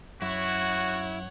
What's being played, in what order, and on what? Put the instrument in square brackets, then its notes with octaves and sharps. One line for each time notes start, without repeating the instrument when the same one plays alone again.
[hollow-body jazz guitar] F#2 [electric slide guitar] E4 [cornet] F#4 [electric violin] C#5 F#5